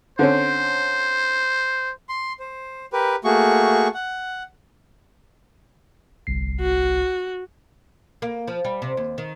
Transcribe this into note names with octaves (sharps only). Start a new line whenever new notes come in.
D3 C4 C#4 C5
C6
C5
G4 A#4 B4
A3 A#3 F#4 G#4 C#6
F#5
G1 C2 C7
F#4
A#3
F3
G3
C3
D#2
D#3